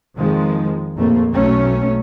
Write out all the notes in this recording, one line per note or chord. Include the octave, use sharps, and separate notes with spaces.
F2 D#3 F3 G#3
A#1 F2 A3 A#3
B1 F#3 A3 C#4